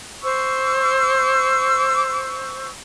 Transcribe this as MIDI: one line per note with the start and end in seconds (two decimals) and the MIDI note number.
0.23 2.70 72
0.23 2.70 85
0.23 2.70 88